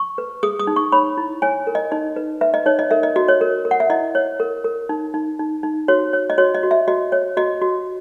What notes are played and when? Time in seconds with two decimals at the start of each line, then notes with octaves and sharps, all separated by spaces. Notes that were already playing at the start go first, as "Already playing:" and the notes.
Already playing: C#6
0.18 B4
0.43 G#4 D#6
0.59 D#6
0.67 D#4
0.76 C#6
0.92 C#5 B5
1.17 E4
1.42 C#5 G#5
1.67 A#4
1.75 D#5
1.92 D#4 D#5
2.16 B4
2.41 B4 E5
2.54 D#5
2.66 D#4 C#5
2.79 D#5
2.91 A#4 E5
3.03 D#5
3.16 F#4 D#5
3.28 C#5
3.41 A#4
3.65 A#4
3.71 F#5
3.80 E5
3.90 E4 D#5
4.15 C#5
4.40 A#4
4.64 A#4
4.89 D#4
5.14 D#4
5.39 D#4
5.63 D#4
5.88 F#4 C#5
6.13 C#5
6.30 D#5
6.38 F#4 C#5
6.55 D#5
6.63 F#4
6.71 E5
6.88 F#4 D#5
7.12 C#5
7.37 F#4 D#5
7.62 F#4